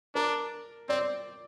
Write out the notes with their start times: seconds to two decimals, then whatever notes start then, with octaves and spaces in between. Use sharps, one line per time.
0.15 D4 A#4
0.89 C4 D5